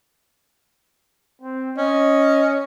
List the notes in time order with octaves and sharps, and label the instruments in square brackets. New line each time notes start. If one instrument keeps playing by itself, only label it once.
[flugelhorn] C4
[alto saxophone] C#4 [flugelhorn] D#5